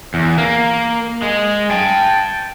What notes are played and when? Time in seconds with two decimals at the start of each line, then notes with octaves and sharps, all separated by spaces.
0.14 E2
0.38 A#3
1.22 G#3
1.71 G5 A5